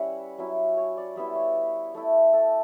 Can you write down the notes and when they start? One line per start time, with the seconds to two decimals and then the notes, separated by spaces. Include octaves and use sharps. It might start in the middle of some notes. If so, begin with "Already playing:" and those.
Already playing: G3 C#4 E4 B4 E5 F#5
0.38 F#3 C#4 E4
0.77 C#5
0.97 D5
1.16 G3 B3 E4 E5
1.35 C#5
1.94 A3 E4
2.33 A4